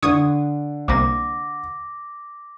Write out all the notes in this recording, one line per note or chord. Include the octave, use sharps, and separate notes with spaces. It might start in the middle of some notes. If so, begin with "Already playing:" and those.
D3 D4 C#6 D#6 G#6
C2 C3 A#3 D6 A#6